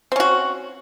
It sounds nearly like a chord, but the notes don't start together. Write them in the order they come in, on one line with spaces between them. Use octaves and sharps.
C4 C#4 F#4